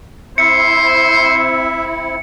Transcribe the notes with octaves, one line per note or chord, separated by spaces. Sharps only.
C4 E4 C5 E5 C#7